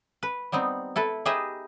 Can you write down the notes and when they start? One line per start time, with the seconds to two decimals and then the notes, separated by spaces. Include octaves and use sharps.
0.23 B4
0.52 G3 B3 C4 D#4
0.96 E4 A4 B4
1.25 D#4 G4 G#4 B4 D#5 E5